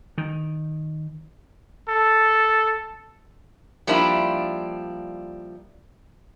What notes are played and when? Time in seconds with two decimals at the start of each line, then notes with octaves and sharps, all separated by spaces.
0.18 D#3
1.88 A4
3.87 F3 G3 A#3 D4 E4